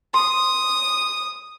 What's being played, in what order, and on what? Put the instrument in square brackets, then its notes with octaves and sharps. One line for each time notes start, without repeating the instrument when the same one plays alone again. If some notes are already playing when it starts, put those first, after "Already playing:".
[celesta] C6 [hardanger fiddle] D#6